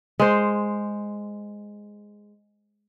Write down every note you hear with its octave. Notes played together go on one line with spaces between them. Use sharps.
G#3 C5